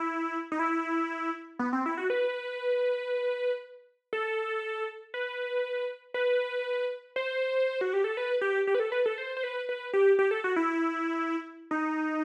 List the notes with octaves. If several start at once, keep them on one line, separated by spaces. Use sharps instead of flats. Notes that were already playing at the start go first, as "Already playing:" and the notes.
Already playing: E4
D#4
E4
B3
C4
E4
F#4
B4
A4
B4
B4
C5
F#4
G4
A4
B4
G4
G4
B4
A4
B4
A4
C5
C5
B4
B4
G4
G4
A4
F#4
E4
D#4